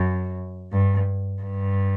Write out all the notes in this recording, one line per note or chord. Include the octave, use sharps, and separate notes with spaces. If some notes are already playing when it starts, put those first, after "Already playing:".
Already playing: F#2
G2
G2